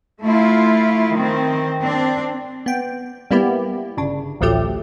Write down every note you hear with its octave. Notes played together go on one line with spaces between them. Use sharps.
A3 E4 F4
D#3 C4
C4 D4
B3 G5
G3 A#3 B3 E4 G4
G1 C#3 D4
A1 D2 F3 F#3 A3 G4